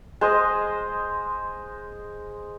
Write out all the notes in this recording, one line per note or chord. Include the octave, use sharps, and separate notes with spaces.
G#3 C5 D#5